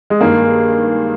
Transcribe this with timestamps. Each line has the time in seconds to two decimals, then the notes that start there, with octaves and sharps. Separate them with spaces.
0.10 G#3
0.21 G2 D#3 G#3 A#3 D#4 G#4